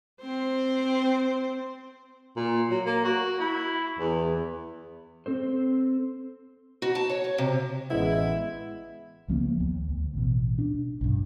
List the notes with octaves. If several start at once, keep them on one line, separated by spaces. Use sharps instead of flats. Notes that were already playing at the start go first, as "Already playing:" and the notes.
C4 C5
A#2
F#3
A#3
F#4
E4
E2
C4 A4 C5
F#4
A5
C#5
C#5
C3
A1 G#3 B3 E4
C#2 F3 A#3 B3
D#2
D2
A1 B2
D4
B1 G2